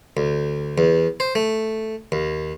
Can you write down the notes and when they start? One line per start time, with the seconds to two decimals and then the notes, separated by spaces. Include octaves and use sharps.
0.17 D2
0.78 E2
1.20 C5
1.35 A3
2.12 D#2